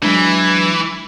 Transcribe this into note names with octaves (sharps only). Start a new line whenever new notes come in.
E3 F#3 G#3 D4